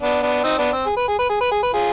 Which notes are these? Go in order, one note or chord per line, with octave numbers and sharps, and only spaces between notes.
B3 D4
B3 D4
C4 D#4
B3 D4
C4
G#4
B4
G#4
B4
G#4
B4
G#4
B4
F4 G#4